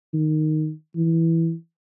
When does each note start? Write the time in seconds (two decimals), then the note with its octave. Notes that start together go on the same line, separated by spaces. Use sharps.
0.14 D#3
0.96 E3